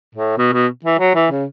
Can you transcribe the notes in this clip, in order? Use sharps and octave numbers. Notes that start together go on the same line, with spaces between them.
A2
B2
B2
E3
F#3
E3
C#3